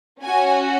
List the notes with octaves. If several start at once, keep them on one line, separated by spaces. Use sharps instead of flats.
C#4 F#4 G#5